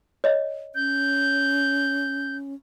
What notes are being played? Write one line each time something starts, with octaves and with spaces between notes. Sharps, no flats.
C#5 D#5
C#4 G6